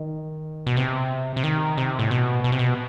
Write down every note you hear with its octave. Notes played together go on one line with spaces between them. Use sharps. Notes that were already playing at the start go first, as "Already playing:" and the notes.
Already playing: D#3
B2
C3
C3
D#3
C3
A2
B2
B2
C3
B2